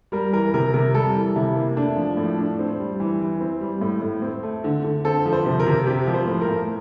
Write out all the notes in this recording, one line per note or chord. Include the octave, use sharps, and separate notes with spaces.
G3 A#4
E3 A#4
C3 A#4
C3 A#4
G3 A4
E3
C3 E4
A#3
A3 D4
F3
A2
D4
C4
G3
E3
E3
C4
G3
A2
A2
C4
A3
D3
D3
C4 A4
F3
C5
C3
A#4
C3
C4 G4
F3
C5
A2
A#4
A2